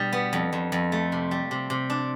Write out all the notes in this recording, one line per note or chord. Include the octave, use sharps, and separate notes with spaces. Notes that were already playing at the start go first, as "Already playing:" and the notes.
Already playing: B2 G3 D4
B3
F2
F2
F2
A3
C3
G3
C3
C3
D4